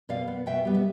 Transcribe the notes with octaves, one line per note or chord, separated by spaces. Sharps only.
B2 D5 F5
B3
B2 E5 G5
G3 B3
E5